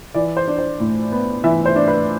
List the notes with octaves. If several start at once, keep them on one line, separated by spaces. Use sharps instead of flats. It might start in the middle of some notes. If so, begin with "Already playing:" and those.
E3 D5
C5
D4
C5
A2
B3
E3 E5
C5
D4
B4